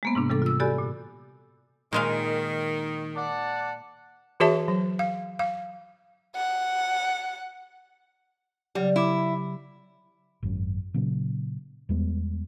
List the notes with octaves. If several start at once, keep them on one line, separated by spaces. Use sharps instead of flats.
G#3 A#3 B3
G#2 C3 D4
C3 E3 G3 D4 A4 D6
F4 E6
F#4 G4 A4 D5 G#5 B5
A#2
A#2 D#3 G#3 F5
D5 F#5 A5
E3 F#4 G#4 C#5 E5 A5
F#3
F5
F5
F#5
C#3 F#3 G3 G4
E4 E5 D6
G#1 F#2 C#4
A#2 C#3 F#3
E2 G3 G#3 B3